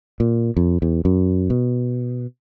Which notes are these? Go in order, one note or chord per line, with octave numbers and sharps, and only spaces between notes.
A#2
F2
E2
F#2
B2